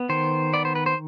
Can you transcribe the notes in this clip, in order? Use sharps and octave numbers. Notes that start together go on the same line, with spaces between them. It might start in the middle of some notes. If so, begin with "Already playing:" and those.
Already playing: B3
D#3 C5
B3 D5
C5
B4
C5